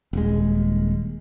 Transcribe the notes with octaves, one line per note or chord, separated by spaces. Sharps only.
D#1 G#3